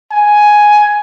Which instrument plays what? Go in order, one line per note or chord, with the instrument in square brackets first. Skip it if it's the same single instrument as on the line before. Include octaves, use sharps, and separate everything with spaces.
[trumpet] G#5